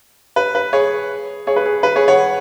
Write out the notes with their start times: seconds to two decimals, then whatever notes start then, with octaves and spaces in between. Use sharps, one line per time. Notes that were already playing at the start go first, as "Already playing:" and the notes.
0.36 B4
0.55 B4
0.73 G#4 C#5
1.47 G#4 C#5
1.56 B4
1.66 G#4
1.83 B4
1.96 G#4 C#5
2.08 C#5 F#5